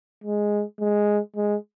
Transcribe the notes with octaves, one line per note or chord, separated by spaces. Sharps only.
G#3
G#3
G#3